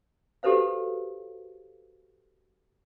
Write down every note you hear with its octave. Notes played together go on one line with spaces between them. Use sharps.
F#4 G4 A4 B4 C5 F5